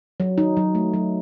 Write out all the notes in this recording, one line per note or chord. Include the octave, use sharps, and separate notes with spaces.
F#3
D#4
F#3
A3
F#3